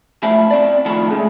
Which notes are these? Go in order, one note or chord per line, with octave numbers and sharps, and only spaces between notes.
F#2 F3 A3 E5 A5 B5
C4 D5
D#3 F3 A3 F4 A5 B5
C#3 G#3 A3